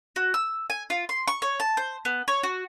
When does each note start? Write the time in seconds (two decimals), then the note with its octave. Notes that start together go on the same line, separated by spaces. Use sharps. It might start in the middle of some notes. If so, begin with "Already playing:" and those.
0.16 F#4
0.34 E6
0.70 G#5
0.90 F4
1.09 C6
1.28 C#6
1.42 C#5
1.60 A5
1.77 C5
2.05 B3
2.28 C#5
2.43 F#4